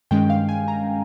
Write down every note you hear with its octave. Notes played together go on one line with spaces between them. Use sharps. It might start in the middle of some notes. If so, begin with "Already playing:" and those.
G2 D#3 G#3 C#4 G5
F5
G#5
A#5